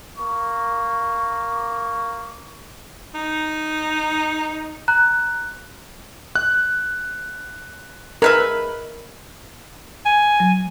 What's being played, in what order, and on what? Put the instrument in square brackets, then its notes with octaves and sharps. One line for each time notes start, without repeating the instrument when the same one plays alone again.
[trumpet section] A#3 C#6
[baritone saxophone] D#4
[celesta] A#5 F#6
[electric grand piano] F#6
[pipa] G#3 B4 E5 [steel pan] A#4
[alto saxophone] G#5
[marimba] F#3